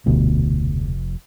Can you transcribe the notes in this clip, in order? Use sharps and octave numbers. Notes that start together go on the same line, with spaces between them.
F1 D2 B2